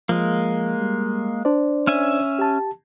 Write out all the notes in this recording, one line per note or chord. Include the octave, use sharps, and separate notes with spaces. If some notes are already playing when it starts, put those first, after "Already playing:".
F3 G#3 A#3
G3
D4 C5 D5
C#4 E5 G#5
G4 A5